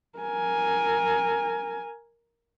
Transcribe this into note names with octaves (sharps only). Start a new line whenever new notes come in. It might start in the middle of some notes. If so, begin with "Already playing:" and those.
A#4 G#5